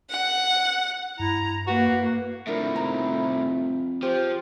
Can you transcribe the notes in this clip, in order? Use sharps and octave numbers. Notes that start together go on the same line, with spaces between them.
F#5
G2 E4 A#5
A#3 F#4 B4
C2 F2 A2 D4 E4 A#4
D#4 A#5
F3 G4 G#4 C5